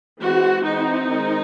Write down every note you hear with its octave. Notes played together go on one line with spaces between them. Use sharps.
E3 G#3 C4 F#4
E3 C4 D#4
D#3 G#3 C4